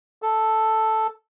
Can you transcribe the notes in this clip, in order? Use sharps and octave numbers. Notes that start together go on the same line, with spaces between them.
A4